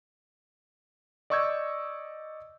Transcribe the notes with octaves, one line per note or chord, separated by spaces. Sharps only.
D5 D#5 C#6 E6 G6 G#6